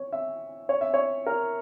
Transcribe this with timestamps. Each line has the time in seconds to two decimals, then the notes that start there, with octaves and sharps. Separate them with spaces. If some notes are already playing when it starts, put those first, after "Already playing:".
Already playing: C#5
0.13 E5
0.69 C#5
0.81 E5
0.94 C#5
1.27 A#4